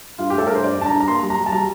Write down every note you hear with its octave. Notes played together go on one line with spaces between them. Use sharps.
G2 F4
G4
A3 A4
G2 A#4
C5
G2 D5
G2 A5
A#5
G2
A#5
A#3 C6
G3
A#5
G3
A5
G3 A#5